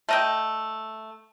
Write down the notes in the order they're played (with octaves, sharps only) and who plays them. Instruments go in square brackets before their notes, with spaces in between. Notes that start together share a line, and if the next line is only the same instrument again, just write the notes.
[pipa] A3 D#5 G5